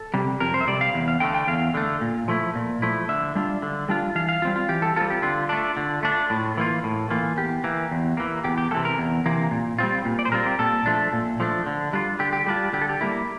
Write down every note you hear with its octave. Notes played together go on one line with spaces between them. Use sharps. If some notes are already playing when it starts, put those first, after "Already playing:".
Already playing: A4
C3 G3
F2 A#4
C5
E5
C3 G3 D5
F5
E2
F5
D3 A3 G5
G5
E2 F5
D3 A3
A#2
F3 A3 E4
A#2
F3 A3 E4
D3 E5
G3 D4 F4
D3
G3 D4 F4
E3 F5
F5
G3 C4 F4
F4
E3 G4
A4
G3 C4 F4 A4
G4
D3 F4
A3 D4
D3
A3 D4
A2
E3 A#3 F4
A2
E3 A#3 F4
E2 G4
E3 A#3
E2
E3 A#3
E2 G4
G4
C3 E3 A#3 A4
A#4
E2
C3 E3 A#3
A#2
G3 C4 F4
A#2
D5
C5
G3 C4 F4 A#4
G4
A#2 A4
F3 A3 D4
A#2
F3 A3 D4
D3
G3 D4 F4
D3 G4
G4
G3 D4 F4 G4
D3 G4
A4
G4
G3 A#3 E4